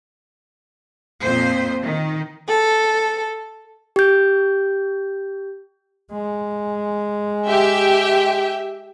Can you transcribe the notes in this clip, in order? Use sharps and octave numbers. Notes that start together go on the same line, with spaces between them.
F2 A#2 C5
D#3
A4
G4 G6
G#3
G4 E5 G5